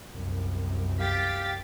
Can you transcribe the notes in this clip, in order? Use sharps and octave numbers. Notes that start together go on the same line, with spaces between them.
C2 F#2
G4 F5 G5 A6 B6